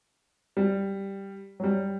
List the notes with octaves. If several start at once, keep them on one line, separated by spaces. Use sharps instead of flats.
G3
F#3
G3